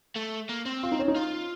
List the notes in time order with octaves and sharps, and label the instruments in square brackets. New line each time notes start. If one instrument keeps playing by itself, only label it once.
[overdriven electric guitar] A3
A#3
C4
[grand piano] F4
D#4
C#4
D#4
[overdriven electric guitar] F4